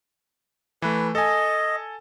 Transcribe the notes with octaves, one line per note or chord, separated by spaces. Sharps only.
E3 A3 B4
A4 D#5 G#5